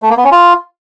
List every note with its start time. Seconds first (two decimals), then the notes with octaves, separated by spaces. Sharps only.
0.03 A3
0.10 A#3
0.17 B3
0.24 C#4
0.32 F4